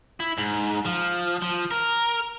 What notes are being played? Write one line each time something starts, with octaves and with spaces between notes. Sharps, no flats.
E4
G#2
F3
F3
A#4